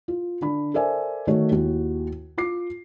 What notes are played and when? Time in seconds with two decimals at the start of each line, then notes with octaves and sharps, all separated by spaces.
0.08 F4
0.42 D3 D4 B5
0.74 A4 A#4 C5 D5 E5 G#5
1.27 D3 D#3 A3 D4 F#4 C#5
1.51 D#2 E4 F#4
2.37 F4 D6 C7